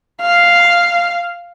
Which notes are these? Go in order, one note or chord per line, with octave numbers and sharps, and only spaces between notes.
F5